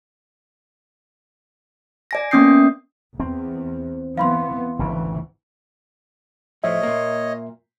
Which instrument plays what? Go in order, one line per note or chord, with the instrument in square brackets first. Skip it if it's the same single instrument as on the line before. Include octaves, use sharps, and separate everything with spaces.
[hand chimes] D5 G#5 A#6
A#3 B3 C#4 D#6 G6 C7
[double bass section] E2 [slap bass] C4
[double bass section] E3 B3 [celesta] F5 B5 C6
[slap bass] G#1 D2 C#3 [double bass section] E3
[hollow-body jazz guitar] A2 F3 A3 [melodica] C#5 D#5 [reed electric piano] E5
[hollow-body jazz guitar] A#2 A#3